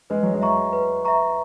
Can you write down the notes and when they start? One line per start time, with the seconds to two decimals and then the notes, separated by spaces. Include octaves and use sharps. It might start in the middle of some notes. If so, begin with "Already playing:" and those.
0.10 G#3 B4
0.23 F#3
0.35 G#3
0.41 E5 A#5 C#6
0.73 B4
1.05 E5 A#5 C#6